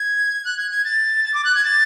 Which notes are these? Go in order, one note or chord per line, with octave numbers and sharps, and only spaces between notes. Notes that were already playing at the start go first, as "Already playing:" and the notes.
Already playing: G#6
F#6
G#6
G#6
A6
A6
D6
F#6
G#6
A6